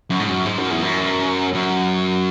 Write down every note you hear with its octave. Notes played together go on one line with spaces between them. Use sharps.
F#2
G#2
F#2
G#2
F#2
E2
F#2
F#2